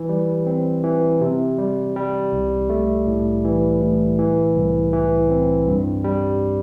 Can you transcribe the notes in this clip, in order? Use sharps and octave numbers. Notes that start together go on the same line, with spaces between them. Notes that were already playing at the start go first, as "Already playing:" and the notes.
Already playing: E3
G3
C4
E3
C3
G3
G3
C2
A3
A2
E3
A2
E3
C2
E3
C4
G2
G3